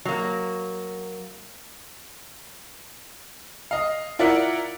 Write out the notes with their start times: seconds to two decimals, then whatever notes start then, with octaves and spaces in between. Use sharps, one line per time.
0.05 F#3 A#3
3.71 D#5 F5
4.19 E4 F4 A#4 D5 E5 F#5